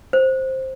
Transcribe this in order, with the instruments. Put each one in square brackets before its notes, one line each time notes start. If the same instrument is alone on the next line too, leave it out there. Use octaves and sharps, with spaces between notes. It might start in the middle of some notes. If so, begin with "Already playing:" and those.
[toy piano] C5